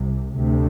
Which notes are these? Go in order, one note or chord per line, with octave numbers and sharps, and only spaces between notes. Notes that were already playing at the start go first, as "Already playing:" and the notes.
Already playing: C2 C3
D2 C3